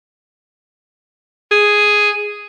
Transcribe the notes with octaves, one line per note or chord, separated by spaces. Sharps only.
G#4